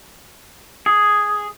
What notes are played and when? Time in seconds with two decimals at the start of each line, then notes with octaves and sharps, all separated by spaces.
0.86 G#4